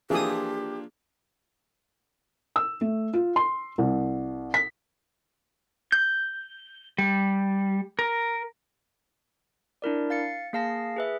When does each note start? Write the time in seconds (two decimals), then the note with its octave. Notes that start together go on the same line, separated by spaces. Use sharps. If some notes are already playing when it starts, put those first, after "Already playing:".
0.10 E3 F3 A#3 D4 F4 G4 G#4 D#6
2.56 E6
2.81 A3
3.13 F4
3.36 C6
3.78 C2
4.54 B6
5.92 G6
6.98 G3
7.99 A#4
9.82 D4 E4 A#4 D5
10.10 F5 A6 C#7
10.53 A#3 G#4 F5 A5 A#6 C7
10.97 G#4 B4 E5